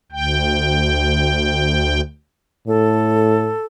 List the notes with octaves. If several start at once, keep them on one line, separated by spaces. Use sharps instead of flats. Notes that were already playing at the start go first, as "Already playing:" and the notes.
D2 G5
A2 A4